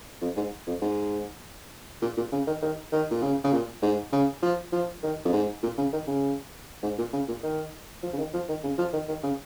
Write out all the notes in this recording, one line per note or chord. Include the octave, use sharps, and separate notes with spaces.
F2
G#2
F2
G#2
A#2
A#2
C#3
D#3
D#3
D#3
A#2
C#3
C#3
A#2
G#2
C#3
F3
F3
D#3
F2
G#2
A#2
C#3
D#3
C#3
G#2
A#2
C#3
A#2
D#3
F3
C#3
D#3
F3
D#3
C#3
F3
D#3
D#3
C#3